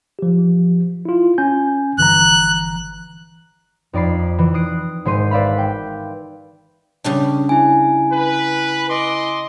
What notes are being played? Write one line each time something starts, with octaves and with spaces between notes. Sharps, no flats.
F3 G4
E4 F4
C#4 G#5 G6
G1 E3 A#5 F#6
F2 D#4 D5 B5 C7
E3
D#6 F#6 C7 D7
G#1 G#3 C5 E5 C6 D#7
B4 D5 E5 F5 B5
G5
C#3 G3 D4
E4 G#5
B4
D#5 C6 D6